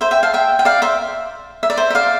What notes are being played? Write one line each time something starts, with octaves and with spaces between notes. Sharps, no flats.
C5 E5
E5 G5
F5 A5
E5 G5
G5
D5 F5
C5 E5
E5
D5
C5 E5
E5
D5 F5